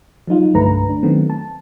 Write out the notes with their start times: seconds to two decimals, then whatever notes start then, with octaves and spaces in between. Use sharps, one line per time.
0.27 F3 F#3 D#4 F4
0.54 C2 G2 D3 A3 B4 A#5
0.89 D4
1.03 D#3 F#3 A3 B3 C4
1.30 A5